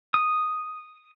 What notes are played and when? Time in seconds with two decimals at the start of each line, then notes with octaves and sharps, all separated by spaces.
0.14 D#6